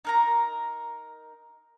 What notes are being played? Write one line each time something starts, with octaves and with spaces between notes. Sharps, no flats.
D#4 A#4 A#5